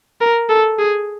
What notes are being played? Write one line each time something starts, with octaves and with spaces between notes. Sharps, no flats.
A#4
A4
G#4